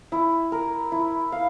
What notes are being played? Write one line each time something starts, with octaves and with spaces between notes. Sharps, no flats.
E4
A#4
E4
F5